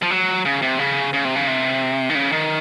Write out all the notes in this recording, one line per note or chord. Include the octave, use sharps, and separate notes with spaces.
F3
F#3
C#3
C3
C#3
C#3
C3
C#3
C3
D#3
C#3
D#3